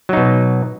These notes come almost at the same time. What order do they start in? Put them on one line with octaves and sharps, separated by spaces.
F#3 D#4 B2